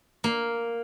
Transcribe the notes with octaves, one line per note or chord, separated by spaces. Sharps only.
A#3